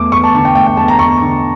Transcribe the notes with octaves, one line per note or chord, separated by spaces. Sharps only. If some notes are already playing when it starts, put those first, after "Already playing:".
Already playing: E2 A3 D6
E2 C#6
A5
D3 A5
G5
A3 G5
G5
E2 A5
A#5
E2 C#6
D3